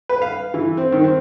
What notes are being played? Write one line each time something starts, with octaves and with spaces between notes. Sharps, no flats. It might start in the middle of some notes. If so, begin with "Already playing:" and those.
B4
F5
E3
C4
D#3
C4